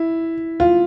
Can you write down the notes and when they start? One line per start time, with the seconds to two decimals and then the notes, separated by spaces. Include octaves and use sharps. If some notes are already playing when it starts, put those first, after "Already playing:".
Already playing: E4
0.60 F4